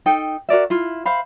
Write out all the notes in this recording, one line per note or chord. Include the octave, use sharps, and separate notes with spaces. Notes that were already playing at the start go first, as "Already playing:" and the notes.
D#4 A4 G5
F#4 A#4 D5 E5
E4 F4
C5 E5 F5 B5